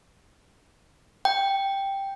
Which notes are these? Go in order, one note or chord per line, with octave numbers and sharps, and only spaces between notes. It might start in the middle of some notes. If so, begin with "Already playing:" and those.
G5